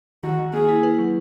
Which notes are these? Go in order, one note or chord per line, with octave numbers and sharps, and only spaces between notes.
D#3 F#4
D#3
A#3 G#4
E4
B4
F#3